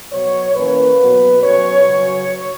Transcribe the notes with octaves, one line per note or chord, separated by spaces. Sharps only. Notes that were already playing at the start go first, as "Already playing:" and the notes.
B2 F#3 B3 C#5
E3 A#3 C#4 B4
B2 F#3 B3
B2 F#3 C#4 C#5
C#3 F#3 C#4